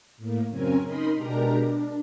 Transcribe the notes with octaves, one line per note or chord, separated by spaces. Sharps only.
A2 A#3
F#2 C#3 C4 C#4 A#4 G#5
D#4 A#4 B5 C6 D#6
B2 G#3 D4 G4 A#4 A#5
D4